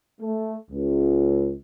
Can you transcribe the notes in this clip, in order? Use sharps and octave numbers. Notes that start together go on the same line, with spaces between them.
A3
C#2